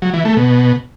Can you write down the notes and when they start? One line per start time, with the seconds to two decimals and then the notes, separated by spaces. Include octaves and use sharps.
0.02 F#3
0.14 E3
0.25 A3
0.37 B2